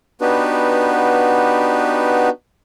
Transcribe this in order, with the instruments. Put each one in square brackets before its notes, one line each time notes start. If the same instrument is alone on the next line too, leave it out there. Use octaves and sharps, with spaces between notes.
[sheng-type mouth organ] B3 D4 D#4 F#4 G4 B4